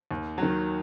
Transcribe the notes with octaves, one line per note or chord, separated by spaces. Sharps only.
D#2
D#3 F#3